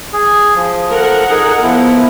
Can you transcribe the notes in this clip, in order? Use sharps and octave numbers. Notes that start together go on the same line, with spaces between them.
G#4
F3
A4 A#4 F#5
D#4 G#4
F3 B3 E4